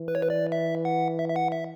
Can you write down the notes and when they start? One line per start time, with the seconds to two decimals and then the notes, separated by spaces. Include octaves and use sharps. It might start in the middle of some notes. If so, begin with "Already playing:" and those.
Already playing: E3
0.08 B4
0.15 C#5
0.22 B4
0.30 D5
0.52 E5
0.85 F#5
1.19 E5
1.29 E5
1.36 F#5
1.52 E5